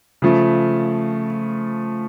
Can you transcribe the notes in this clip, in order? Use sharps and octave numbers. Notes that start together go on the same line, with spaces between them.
C#3 F3 A3